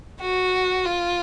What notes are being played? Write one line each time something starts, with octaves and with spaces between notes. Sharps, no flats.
F#4
F4